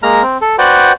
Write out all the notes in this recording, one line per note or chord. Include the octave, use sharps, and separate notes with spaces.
G#3 A#3 A#5 F6
C4
A4
F#4 B4 C5 D5 F#5 G5